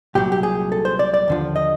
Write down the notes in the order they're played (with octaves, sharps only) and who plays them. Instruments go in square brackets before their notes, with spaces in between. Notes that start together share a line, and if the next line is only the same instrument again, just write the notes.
[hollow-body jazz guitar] C2 A#2 F#3 G4
G4
G#4
A4
C5
D5
D5
D#2 D3 F3
D#5